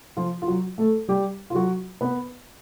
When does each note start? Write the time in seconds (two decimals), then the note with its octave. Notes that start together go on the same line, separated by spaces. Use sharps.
0.17 F3 F4
0.42 F4
0.47 F#3 F#4
0.78 A3 A4
1.08 G3 G4
1.50 F4
1.55 F#3 F#4
2.01 B3 B4